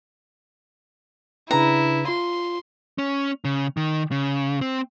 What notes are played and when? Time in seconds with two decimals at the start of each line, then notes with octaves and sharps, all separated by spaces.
1.51 C#3 D4 E4 B4 A#5
2.08 F4 C6
2.98 C#4
3.45 C#3
3.77 D#3
4.11 C#3
4.61 C4